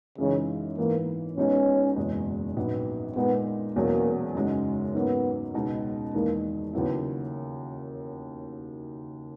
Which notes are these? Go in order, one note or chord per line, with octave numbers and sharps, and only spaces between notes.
F#2 C#3 E3 G#3 D#4
G#2 E3 A#3 B3
B1 B2 G#3 B3 C#4 D#4
F#1 E2 B2 G#3
A#1 G#2 F#3 B3
A#2 G#3 B3 D#4
E1 E2 B2 F#3 A#3 C#4
F#2 C#3 G#3 D#4 F#4
G#2 F#3 A#3 B3 C#4
C#2 B2 G#3 D#4 F#4
E2 D#3 G#3 A#3 D#4
D#2 C#3 F#3 A#3 B3 E4